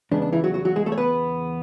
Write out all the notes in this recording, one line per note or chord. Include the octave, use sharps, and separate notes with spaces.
E2 C#3 G#3 B3 D4
D4
E3 E4
F#3 F#4
F#3 F#4
F#3 F#4
G#3 G#4
A3 A4
C#5
B3 B4